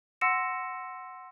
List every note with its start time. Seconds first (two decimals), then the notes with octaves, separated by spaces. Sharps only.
0.21 F#5 C6 E6 A#6 C#7 E7